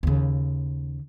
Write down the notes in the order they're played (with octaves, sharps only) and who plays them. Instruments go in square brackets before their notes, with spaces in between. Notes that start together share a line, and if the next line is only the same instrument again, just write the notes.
[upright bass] D#2 C#3